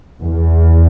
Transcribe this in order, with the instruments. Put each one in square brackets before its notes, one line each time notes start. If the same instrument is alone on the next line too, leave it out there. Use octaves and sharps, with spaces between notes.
[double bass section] E2